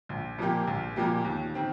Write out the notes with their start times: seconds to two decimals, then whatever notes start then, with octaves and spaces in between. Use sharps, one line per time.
0.09 A#1
0.38 A#2 F3 A#3 G4
0.67 A#1
0.96 A#2 F3 A#3 G4
1.25 D#2
1.54 D#3 C4 G4